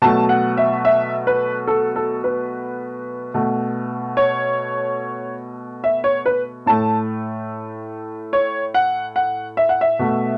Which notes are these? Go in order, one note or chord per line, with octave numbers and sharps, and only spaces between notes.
B2 F#3 A3 A5
F#5
E5
E5
B4
A4
A4
B4
B2 A3
C#5
E5
C#5
B4
A2 A3 A5
C#5
F#5
F#5
E5
F#5
E5
B2 A3